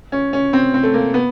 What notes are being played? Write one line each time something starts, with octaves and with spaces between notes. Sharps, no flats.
C#4
C#4
C4
C4
A3
A#3
B3